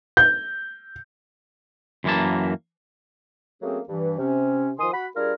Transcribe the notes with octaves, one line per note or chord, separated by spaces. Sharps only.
G6
F#2 E3 A#3 A5
F#3 A3 A#3 C4 C#4 G#4
G2 E3
C3 C#4
D#3 F3 G#5 C6 D#6
F#4 F#5 B5
G3 D4 F4 G#4 A#4